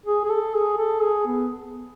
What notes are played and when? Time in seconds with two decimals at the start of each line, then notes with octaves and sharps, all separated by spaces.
0.06 G#4
0.25 G#4
0.30 A4
0.54 G#4
0.78 A4
1.02 G#4
1.27 B3